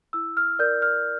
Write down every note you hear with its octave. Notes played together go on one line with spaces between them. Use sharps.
E4 E6
F6
A#4 D5 G6
F6